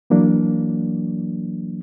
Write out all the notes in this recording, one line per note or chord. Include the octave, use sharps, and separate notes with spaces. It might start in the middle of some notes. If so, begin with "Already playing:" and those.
E3 F#3 A#3 D4